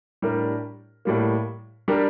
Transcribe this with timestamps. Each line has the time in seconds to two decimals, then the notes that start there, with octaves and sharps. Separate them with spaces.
0.22 A2 G3 D4 G4 A#4
1.05 A2 G3 A#3
1.88 G3 D4 G4 A#4